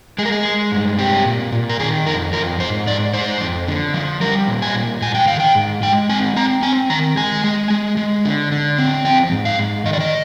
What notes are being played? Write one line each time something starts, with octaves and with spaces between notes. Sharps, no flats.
G#3 G#4
A#4
G#4
G#3
G2
C4 G4
A#2
A#2
A#4
D#3 G#4
F2 A#4
F2 A#4
G#2 C5
G#2 D5
G#2 C5
F2
D3
F3
G3 A#4
A#2
G#5
A#2
G#2 G#5
G5
D#3 F5
G5
G#2
G#3 G5
C4 G#5
C4 A#5
C4 G#5
D#3 A#5
G#3 G#5
G#3
G#3
G#3
D3
D3
C4
F3 G5
G#2
F5
G#2
D#3 D#5
D5
D#5